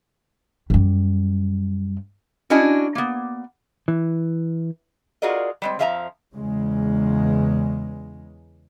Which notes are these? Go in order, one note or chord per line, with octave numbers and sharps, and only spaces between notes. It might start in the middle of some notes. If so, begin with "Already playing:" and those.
F#2 G3
C#4 D4 E4 F#4 D#5 G#5
A#3 B3
E3
F4 F#4 G#4 A#4 D5 D#5
G3 G#3 C4
F2 F3 E5 F5 G#5 A#5
E2 C#3 G#3